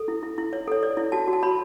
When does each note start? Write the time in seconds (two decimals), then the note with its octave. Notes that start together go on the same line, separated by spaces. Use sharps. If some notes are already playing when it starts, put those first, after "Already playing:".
Already playing: A4
0.08 E4
0.23 E4
0.38 E4
0.53 C#5
0.68 A4 C#5
0.83 C#5 D5
0.97 E4
1.12 F#4 A5
1.28 F#4
1.33 A5
1.43 C#5 B5